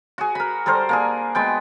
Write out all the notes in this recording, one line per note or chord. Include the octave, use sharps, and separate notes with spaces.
F#4 G#4
A#4 B5
G3 A4 A#4 C5
A#3 D4 G#4
G#3 B3 G5